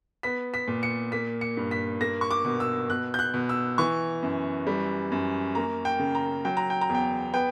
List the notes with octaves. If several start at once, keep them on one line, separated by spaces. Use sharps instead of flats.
B3 B6
B6
A#2
C#7
A#3 B6
C#7
G2
B6
A#3 A#6
C#6
D6
B2
E6
B2 F#6
G6
F#6
B2
E6
E3 C#6
F#2
G3
F#2
A#3 A#5
G5
C#3
A#5
F#3 G5
A#5
G5
A#5
E2
G5
B3 G5